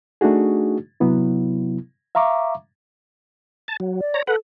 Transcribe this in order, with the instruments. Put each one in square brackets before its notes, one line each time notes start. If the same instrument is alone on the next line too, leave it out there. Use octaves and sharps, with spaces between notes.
[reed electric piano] A3 D4 D#4 F#4 G#4
C3 F#3 B3 E4
E5 F5 A#5 C#6 D6
[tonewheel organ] A5
F#3
[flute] D5
[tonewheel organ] C#5 A#5
[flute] A4 [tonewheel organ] B4 F#5